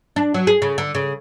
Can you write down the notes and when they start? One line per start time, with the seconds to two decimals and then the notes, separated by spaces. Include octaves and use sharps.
0.16 D4
0.34 F#3
0.47 G#4
0.62 C#3
0.78 D3
0.95 C#3